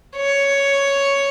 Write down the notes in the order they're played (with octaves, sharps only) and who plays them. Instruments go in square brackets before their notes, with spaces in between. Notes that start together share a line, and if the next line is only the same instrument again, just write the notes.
[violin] C#5